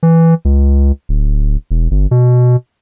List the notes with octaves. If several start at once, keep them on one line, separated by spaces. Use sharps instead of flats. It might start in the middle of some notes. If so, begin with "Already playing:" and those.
E3
C#2
D1
E1
G1
B2